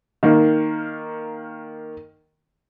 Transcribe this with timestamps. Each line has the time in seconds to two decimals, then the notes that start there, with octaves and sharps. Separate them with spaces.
0.23 D#3 A#3